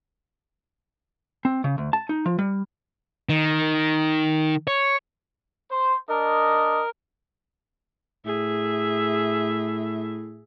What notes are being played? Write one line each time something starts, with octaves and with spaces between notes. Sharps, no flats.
C4
C#3
D2
A5
D#4
F3
G3
D#3
C#5
C5
D4 A#4 D#5
A2 G#4 E5